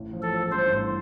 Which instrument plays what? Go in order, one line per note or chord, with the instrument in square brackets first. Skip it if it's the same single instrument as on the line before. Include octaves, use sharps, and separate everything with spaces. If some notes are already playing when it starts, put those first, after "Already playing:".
Already playing: [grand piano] A1
F3
[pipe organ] A4
[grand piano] F3
[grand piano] G2 [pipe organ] C5
[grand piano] A1